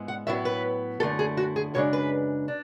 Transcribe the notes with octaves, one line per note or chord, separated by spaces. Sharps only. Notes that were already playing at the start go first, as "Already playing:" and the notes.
Already playing: G#2 G#3 B3 E4
F#5
A2 F#3 B3 E4 E5
B4
F#2 D3 A3 E4 A4
G#4
F#4
G#4
F#2 C#3 G#3 D4 C#5
B4
D4